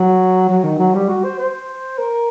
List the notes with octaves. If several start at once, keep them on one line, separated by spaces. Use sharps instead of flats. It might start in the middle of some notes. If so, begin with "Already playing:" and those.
Already playing: F#3
F#3
D#3
F#3
G3
F#4
C5
C5
A#4